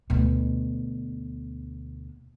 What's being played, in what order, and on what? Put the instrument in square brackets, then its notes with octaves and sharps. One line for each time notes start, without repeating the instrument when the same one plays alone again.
[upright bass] D2 B2